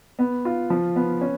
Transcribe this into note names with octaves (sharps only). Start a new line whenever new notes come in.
B3
F4
F3
B3
C#4